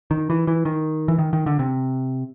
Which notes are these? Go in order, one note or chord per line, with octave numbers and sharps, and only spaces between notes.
D#3
E3
E3
D#3
E3
D#3
D#3
D3
C3